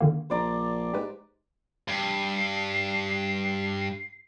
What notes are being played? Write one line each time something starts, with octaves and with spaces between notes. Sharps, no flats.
D3 D#3 A#3
A#1 C5 D5 A#5
G#2 G4 B4
G2 C7